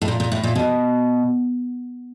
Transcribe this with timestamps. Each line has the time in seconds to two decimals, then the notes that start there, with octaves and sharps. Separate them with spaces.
0.02 A2
0.08 A#2
0.20 A#2
0.32 A2
0.43 A#2
0.56 B2